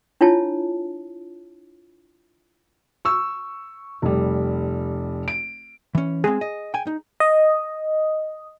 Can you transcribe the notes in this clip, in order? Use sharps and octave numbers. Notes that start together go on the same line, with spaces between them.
D4 E4 F4 C#5 A5
C#6 E6
F1 G3
D7
E3 C#4
G#3 C4 G#4
D#5
G5 G#5
D#4
D#5